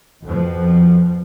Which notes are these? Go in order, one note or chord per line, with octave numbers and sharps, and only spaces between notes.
F2 B2 F3